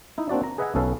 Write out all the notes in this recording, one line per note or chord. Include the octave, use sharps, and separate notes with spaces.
D#4 E4
A#3 C4 D4 F#4 D5
A#5
G#4 B4 D#5 E5 F#5 G#5
B1 C#4 A4 B4 F5